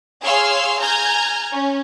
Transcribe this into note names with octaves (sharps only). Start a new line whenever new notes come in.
G#4 C#5 F5 C6 E6 F6
G#5 A#5 F6 G6 G#6
C#4